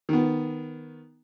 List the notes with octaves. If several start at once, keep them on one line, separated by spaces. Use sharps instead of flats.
D#3 B3